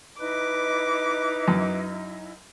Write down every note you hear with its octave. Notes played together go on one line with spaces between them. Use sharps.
D#4 E4 B4 D#5 D6
F#2